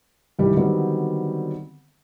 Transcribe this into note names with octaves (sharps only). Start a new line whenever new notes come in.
C2 D#3 E3 G3 G4
D3 D#3 F#3 G3 B3 C4